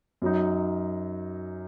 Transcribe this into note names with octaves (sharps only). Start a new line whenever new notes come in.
F#2 F#3 D#4